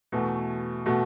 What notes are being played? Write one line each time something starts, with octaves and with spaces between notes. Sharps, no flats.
E2 B2 A3 F#4
B2 A3 F#4